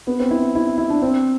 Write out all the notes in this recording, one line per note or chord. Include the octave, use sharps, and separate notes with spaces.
B3
C4
E4
E4
E4
D4
C4